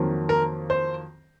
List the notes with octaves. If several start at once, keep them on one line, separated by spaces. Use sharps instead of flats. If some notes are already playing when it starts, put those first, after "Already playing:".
Already playing: F2 D#3 F#3 A#3
A#4
C5